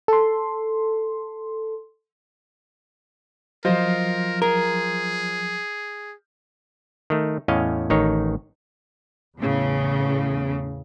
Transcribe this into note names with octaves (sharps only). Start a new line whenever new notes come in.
A4 C6
F3 F#3 F4 A#4 C5 D#5
G#4 A#4
D#3 A3
E2 A2 C#4 D#5 F5
A1 D#3 D#4 C#5
E2 A2 C#3